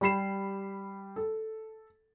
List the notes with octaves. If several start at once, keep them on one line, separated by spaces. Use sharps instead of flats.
G3 G4 B5 C7 E7
A4